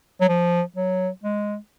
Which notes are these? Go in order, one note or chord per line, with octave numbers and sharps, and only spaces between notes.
F#3
F3
F#3
G#3